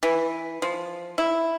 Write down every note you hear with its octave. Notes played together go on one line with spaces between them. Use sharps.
E3
F3
E4